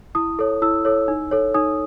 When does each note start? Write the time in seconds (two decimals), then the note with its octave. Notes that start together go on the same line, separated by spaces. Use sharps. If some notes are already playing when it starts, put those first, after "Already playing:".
0.15 E4 D#6
0.39 A4 C#5
0.62 E4 E6
0.85 A4 C#5
1.08 D#4
1.31 A4 C#5
1.54 D#4 D#6